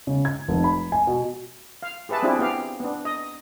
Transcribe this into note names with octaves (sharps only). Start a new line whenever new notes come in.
C#3
G#6
F1
B5
G#5
B2
F5
G4 G#4 B4 E5 A5
C4 D4 E4 F4 G4 G#4
B3 G4 F5
B3 D4
D#5